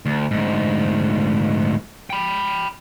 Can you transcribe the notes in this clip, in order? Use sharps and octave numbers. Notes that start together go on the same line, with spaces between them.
D2
D2 G#2
G5 B5